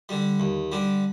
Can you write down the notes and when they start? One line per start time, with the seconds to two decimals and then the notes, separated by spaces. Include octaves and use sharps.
0.09 D3 G3
0.40 D#2
0.72 D3 G3